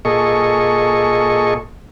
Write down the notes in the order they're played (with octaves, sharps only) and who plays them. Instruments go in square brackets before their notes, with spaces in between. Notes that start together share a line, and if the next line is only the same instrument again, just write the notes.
[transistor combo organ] A#2 G#4 A4 D#5 C#6